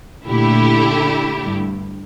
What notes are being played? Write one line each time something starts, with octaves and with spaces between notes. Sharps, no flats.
A#2 D3 A3 E4 G4
G2